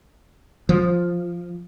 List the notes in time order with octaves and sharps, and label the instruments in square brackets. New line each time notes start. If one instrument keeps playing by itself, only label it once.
[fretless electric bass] F3